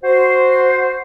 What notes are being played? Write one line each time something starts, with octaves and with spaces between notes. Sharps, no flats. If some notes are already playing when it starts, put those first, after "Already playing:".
F#4 C5